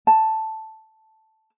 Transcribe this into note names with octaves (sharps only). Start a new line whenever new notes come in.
A5